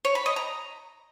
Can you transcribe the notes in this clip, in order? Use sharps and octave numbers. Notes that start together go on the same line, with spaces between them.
C#5
B5
D#5
A#5